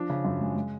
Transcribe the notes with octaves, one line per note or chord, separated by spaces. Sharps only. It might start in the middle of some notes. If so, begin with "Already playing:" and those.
Already playing: F3 D4
C#3
F#2
G#3
G#3